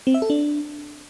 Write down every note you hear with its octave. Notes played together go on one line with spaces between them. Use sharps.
C4
E5
A4
D4